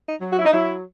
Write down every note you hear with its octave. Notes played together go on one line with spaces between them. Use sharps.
D#4
F#3
F#4
E4
D#4
F#3 E4